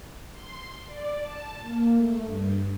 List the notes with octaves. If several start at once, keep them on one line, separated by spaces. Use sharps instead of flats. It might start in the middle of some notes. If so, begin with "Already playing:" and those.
C6
D5
A5
A#3
A3
G2